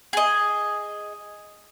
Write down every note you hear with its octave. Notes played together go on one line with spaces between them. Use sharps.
G#4 D#5